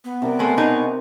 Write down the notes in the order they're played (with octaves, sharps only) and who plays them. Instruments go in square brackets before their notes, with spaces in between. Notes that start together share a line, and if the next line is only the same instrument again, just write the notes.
[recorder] B3
[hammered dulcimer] C3 A#4 D5
[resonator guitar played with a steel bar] G#3 A3
B2 D#4 G#4